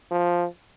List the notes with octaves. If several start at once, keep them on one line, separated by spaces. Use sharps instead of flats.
F3